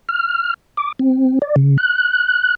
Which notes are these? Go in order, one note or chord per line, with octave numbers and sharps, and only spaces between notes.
F6
D6
C4
D5
C#3
F#6